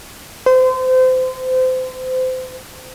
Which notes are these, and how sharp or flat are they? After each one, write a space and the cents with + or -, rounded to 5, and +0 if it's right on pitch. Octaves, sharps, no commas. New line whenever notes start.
C5 -30